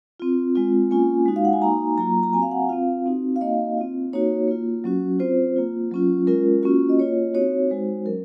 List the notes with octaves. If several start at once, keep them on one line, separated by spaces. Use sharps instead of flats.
C4 F4
G#3 C4 F4
A#3 C#4 F4 G#5
G#3 D#4 F#4
F5
F#5
G#5
A#3 D#4 F#4 A#5
F#3 A#3 F4 A#5
A#5
C4 F#4 G#5
F5
F#5
C4 F4 F5
C4 D#4 F#4
F5
A#3 D#4 F#4 D#5
C4 F4
A#3 D#4 F#4 C#5
A#3 F4
F#3 C#4 F#4
C4 F4 C5
A#3 F4
F#3 C#4 F4
G#3 C#4 F4 A#4
A#3 C#4 F4 F#4
D#5
A#3 F4 C#5
C4 D#4 F#4 C#5
G#3 D#4 F#4 C5
F#3 C#4 A#4